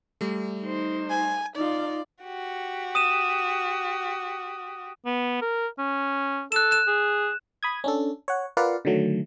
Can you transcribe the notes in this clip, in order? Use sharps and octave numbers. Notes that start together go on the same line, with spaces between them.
G3 A3
D#4 C5
G#5
D#4 F4 D5
F#4 G4
D#6 D#7 E7
B3
A#4
C#4
A4 F#6 E7
F#6 E7
G#4
B5 D#6 G#6
C#4 D4 A4
C#5 F#5
F4 A#4 B4 D5 F5 F#5
D3 D#3 F#3 A3